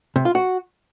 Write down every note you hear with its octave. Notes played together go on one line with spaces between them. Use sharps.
C3
F4
F#4